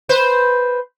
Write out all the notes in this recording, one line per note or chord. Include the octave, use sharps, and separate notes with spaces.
B4 C5